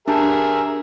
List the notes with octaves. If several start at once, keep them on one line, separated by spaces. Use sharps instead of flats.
D4 G4 G#4 A#4 E5 A5